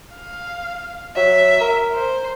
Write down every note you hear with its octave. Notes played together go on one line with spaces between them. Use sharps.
F5
F#3 E5
A#4
C5